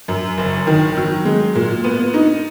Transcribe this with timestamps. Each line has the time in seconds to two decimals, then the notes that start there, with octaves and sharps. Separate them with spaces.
0.08 F#2
0.37 F#1
0.67 D#3
0.97 F#3
1.25 G#3
1.55 A#2
1.84 B3
2.14 D#4